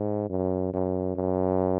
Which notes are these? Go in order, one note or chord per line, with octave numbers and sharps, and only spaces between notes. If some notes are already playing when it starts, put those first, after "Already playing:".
Already playing: G#2
F#2
F#2
F#2